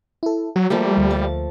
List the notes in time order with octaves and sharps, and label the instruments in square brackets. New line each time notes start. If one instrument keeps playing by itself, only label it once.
[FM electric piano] E4 A4
[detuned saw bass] F#3 [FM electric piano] F#4
[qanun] F3 A3 A#3 [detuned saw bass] G3
[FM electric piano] D2
[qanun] A5